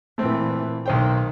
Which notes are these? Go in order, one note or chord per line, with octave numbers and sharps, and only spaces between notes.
A#2 E3 A3 C4
B1 D#3 C5 G5